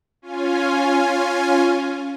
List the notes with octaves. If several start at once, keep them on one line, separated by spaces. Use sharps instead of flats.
C#4 F4 G#5